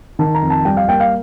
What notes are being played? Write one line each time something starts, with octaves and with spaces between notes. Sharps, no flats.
D#3 A5
A#5
F2
A5
G3 G5
F5
A#3 G5
F5